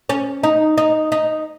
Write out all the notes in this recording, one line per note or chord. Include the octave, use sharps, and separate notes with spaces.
C#4
D#4
D#4
D#4